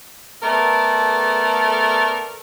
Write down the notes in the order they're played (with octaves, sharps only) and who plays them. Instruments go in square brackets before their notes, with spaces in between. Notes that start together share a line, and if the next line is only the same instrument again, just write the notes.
[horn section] A3 B3 A4 A#4 D5 A5